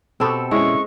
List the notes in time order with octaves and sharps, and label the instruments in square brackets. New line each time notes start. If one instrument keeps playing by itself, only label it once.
[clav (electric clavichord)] B2 B3 G4 [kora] C4 A4
[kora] G#3 [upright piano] C#4 E4 [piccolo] C#6